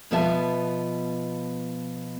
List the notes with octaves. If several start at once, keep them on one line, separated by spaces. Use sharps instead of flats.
B2 F3 B3 B4 E5 A5